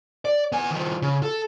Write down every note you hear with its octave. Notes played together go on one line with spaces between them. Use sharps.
D5
B3 G#5
D#3 F3
C#3
A4